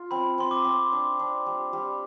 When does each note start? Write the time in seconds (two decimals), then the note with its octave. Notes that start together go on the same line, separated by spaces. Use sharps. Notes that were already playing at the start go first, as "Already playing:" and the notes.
Already playing: F4
0.11 C4 B5
0.38 C4 C6
0.51 D6
0.64 C4
0.92 D4
1.19 D4
1.46 G3
1.73 G3